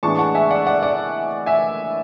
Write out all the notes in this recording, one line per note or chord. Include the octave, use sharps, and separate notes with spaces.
A2 E3 G#3 B3 D4 A5 C#6
F#5 A5
E5 G#5
D5 F#5
D5 F#5
D5 F#5
E5 G#5